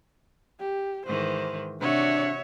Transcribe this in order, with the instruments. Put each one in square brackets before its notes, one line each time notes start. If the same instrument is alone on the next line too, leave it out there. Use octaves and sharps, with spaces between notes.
[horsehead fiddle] G4
[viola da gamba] G#2 D#3 E3 [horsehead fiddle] C5
[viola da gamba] C3 F#4 [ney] D4 [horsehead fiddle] C#5 E5